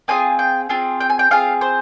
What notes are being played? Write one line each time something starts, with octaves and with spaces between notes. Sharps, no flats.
C4 F4 G#4 G#5
G5
C4 F4 G#4
G5
G#5
G5
C4 F4 G#4 F5
C5